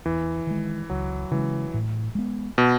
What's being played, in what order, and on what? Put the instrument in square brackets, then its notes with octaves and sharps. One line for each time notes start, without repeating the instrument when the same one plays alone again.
[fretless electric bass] E2 [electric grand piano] E3
[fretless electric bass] D#3 G#3
[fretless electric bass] C#2 [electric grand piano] F#3
[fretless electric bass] C#3 G#3 [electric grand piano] E3
[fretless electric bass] A2
G#3 B3
[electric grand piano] B2